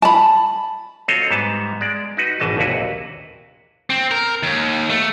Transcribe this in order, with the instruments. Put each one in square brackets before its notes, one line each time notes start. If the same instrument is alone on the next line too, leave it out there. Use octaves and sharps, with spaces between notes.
[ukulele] A5 B5
[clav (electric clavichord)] C4 F4 F#4 A4 C#5 D#5
G#2 G3 B3 A5
G#3 D5
D#4 F#4 B4
G#1 B2 E3 D#5 A5
A#1 D#2 C3 E4 F#4 B4
[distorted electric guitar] C4
A#4
D#2
A3